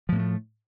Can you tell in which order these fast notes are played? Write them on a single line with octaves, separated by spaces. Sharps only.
F3 A2 A#3 A3